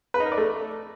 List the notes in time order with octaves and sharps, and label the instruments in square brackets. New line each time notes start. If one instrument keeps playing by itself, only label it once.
[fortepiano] B4
D#4
A#4
D5
A3